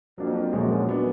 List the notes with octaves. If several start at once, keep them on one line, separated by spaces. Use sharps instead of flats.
F2 F#3 A#3 D4
F#2 A#2 F3 G#3
F#3 B3 D4